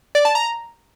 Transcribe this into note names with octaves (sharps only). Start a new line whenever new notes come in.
D5
A5
A#5